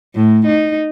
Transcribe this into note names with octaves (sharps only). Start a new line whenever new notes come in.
A2
D#4